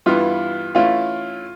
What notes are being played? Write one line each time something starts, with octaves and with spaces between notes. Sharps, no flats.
G2 E3 G3 B3 E4 F4 F5
E3 A3 C#4 E4 F4 F5